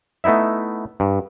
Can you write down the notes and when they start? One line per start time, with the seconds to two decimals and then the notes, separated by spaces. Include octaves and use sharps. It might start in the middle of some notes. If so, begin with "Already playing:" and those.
0.24 A3 B3 D#4 E4 E5
1.00 G2